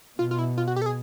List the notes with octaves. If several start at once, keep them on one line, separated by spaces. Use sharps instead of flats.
B2 F4
F4
E4
F4
F#4
G4
A4
G#4